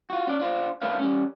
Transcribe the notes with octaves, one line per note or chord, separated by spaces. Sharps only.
F4 F#4
C#4 D5
D4 F4 C5
A3 D4 A#4 B4 C#5 F5
G3 C#4